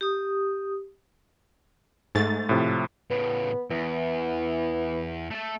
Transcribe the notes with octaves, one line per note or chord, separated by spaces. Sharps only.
G4 D#6
G#2 A3 A6
A2 C3 F3
A2 C#3 B3
E2 E3
A3 A4